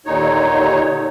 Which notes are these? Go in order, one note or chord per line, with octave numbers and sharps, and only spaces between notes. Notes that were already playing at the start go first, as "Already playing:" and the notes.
D#2 A#2 D3 D#4 C#5